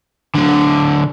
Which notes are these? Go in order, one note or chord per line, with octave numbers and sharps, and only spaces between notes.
D3 F#3